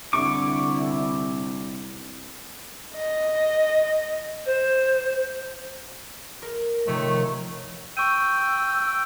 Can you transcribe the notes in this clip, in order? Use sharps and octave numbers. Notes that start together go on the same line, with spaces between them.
C2 D3 E4 C#6 D6
D#5
C5
A#4
C3 D#3 F3 A3 C#5
G5 C#6 E6 D#7